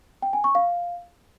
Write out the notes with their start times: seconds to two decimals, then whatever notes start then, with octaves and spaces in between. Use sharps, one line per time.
0.22 G5
0.33 G#5
0.44 C#6
0.55 F5